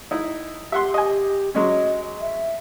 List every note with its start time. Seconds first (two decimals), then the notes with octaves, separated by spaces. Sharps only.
0.11 D#4 E4
0.72 G4 E5 F#5 C6
0.94 D#5 G#5
1.55 F#3 G#3 C#4 D#5
2.21 E5